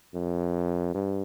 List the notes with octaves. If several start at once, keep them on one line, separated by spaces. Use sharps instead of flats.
F2
G2